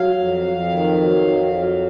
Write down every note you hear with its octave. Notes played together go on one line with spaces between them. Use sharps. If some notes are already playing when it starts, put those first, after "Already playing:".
Already playing: F#3 F5
F2
F2
D#3
F#3
F2
F#3